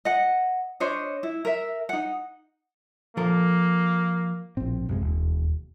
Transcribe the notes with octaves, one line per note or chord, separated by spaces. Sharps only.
D#5 F#5
D4 C5 C#5 D#5
E4
A#4 E5
D#4 F#5
F3 A#3 A4 A#4
A#1 A2 C4
B1 F#2 C3 G#3
E1 D#2